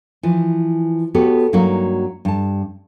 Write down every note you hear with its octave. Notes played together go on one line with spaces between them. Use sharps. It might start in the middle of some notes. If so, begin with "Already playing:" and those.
E3 F3
B3 F#4 G4 A4 C#5
G2 F#3 A#3 D#4 F#4
G2 A5